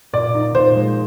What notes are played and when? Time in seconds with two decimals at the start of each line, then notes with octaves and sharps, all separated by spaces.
0.13 A#2 D5
0.34 D#4
0.55 A#2 C5
0.75 G#3